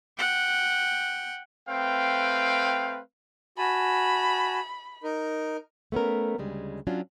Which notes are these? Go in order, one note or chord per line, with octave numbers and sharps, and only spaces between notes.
F#5 G5
A3 C4 B4 F5 G5
F#4 G#5 A5 B5
D#4 A#4
A3 B3 C#4 A#4
D2 C#3 G3 G#3
F#3 C#4 D4 F4